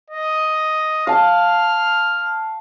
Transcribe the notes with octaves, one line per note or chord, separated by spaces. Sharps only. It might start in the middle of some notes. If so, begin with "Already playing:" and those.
D#5
F5 A5 F6